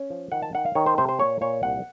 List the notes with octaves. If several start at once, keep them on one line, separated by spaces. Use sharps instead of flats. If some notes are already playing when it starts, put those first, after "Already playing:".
Already playing: C#4
F3
D#3 F#5
A5
D#3 F#5
F5
D#3 C#5
C5
C3 C5
C5
A#2 C#5
A#2 C#5
C2 F#5